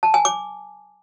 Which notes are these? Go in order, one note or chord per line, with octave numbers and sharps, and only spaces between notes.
A5
G#5
D6